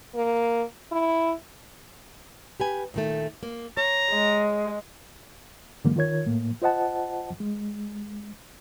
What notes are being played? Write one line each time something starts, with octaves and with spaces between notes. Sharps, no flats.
A#3
E4
G4 B4 G#5
A#2 D#3 A3
A#3
C#5 A#5
G#3
G2 D3 E3 F#3 G#3 A#3
D#3 F4 A#4 C#5 G#6
A2 A#3
F4 C5 D#5 F#5 A5
G#3